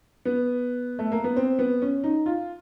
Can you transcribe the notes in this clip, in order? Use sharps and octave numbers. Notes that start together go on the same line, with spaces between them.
B3
A3
A#3
B3
C4
B3
C#4
D#4
F4